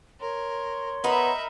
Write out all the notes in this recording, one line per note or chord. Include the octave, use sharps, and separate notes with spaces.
A#4 C#5 C6
B3 D#4 A#4 E5 B5